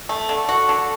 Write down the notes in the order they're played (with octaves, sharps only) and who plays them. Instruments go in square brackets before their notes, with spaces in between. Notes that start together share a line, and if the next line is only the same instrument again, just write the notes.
[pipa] A3
[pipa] D3 [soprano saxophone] A4
[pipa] F#4
D3